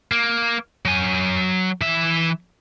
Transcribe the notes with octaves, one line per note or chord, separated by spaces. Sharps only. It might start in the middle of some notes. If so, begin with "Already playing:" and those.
A#3
F#3 G#5
E3 E5